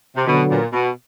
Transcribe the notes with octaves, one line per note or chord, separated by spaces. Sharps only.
C3
B2 D3 F#3 B3
A#2
B2